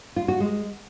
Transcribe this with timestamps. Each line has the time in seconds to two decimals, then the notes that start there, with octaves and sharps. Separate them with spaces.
0.16 F4
0.28 F#4
0.40 G#3